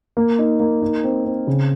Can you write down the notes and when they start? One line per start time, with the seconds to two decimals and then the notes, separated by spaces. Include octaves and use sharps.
0.17 A#3
0.39 D#4
0.60 A#3
0.82 D#4
1.04 C4
1.25 C4
1.47 C#3